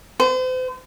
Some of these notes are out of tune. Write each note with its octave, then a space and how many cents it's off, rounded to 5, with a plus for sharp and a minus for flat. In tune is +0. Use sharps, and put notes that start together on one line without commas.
C5 -40